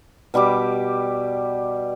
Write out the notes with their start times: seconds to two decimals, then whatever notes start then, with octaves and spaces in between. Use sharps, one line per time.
0.34 B2 G3 G4 D6